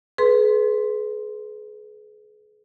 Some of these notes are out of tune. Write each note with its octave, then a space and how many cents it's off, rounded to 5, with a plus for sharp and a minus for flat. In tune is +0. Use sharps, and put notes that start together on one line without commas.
G#4 +35 B4 +0 C6 +0